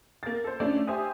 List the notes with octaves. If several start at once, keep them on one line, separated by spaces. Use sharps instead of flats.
A#3 A6
A4 C5
A3 C#4 D4 D5
G4 C5 E5 G#5 D#6